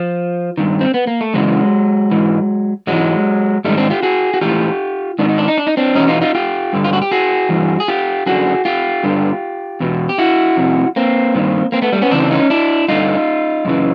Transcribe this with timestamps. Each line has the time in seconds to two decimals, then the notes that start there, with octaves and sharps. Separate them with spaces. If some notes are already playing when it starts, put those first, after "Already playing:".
Already playing: F3
0.58 G2 D#3
0.81 C4
0.94 B3
1.07 A#3
1.21 A3
1.34 F#2 C#3 E3 F#3 G#3
2.11 G#2 E3
2.87 G#2 E3 F#3 G#3
3.64 G#2 D#3 G3 A3
3.77 C4 D4
3.90 F4 G4
4.02 F#4 G#4
4.34 F#4
4.41 A2 E3 F4 G4
5.19 G#2 D#3 D4
5.29 D#4
5.38 D4
5.48 D#4
5.58 D4
5.67 D#4
5.77 C4 D4
5.95 E2 B2 C#4 D#4
6.08 D#4 F4
6.21 D#4 F4
6.35 F4 G4
6.73 G2 D3
6.84 F4
6.93 F#4
7.02 G4
7.11 F#4 G#4
7.49 G2 E3
7.80 G#4
7.88 F4 G4
8.26 F#2 D3 F#4 G#4
8.65 F4 G4
9.04 G2 D3
9.80 E2 B2
10.09 G4
10.18 E4 F#4
10.57 F2 C3
10.96 A#3 C4
11.34 G2 D#3
11.72 A#3 C4
11.82 A3 B3
11.92 G3 A3
12.02 B3 C#4
12.11 E2 C#3 E3 C4 D4
12.31 C#4 D#4
12.50 D4 E4
12.88 G2 D3 D#4 F4
13.65 F#2 C#3 E3